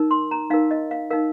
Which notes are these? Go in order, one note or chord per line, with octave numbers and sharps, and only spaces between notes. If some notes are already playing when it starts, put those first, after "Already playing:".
Already playing: D#4 A#4
C6
A#5
D#4 A#4 F5
D#5
F5
D#4 A#4 F5